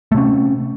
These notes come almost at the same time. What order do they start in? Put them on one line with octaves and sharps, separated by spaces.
A3 C3 C#4